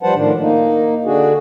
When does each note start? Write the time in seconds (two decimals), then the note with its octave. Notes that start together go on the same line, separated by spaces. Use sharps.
0.03 F3 G3 B4 C5 F#5 A5
0.14 A2 D#3 F3 D4
0.40 A#3 D#4
1.05 D3 D4 F#4 G#4